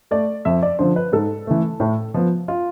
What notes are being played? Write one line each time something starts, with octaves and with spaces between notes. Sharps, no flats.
A3 D5
F2 E5
D5
D3 F3 C5
B4
G#2 A4
E3 A3
A2
F3 B3
F4